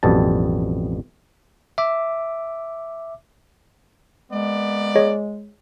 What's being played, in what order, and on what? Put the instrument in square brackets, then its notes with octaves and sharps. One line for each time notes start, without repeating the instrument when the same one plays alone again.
[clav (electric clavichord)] A1 F2 B2 G3 A5
[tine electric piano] E5 D6
[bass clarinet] G#3 [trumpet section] A#3 B3 D5
[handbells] G#4 C#5 D#5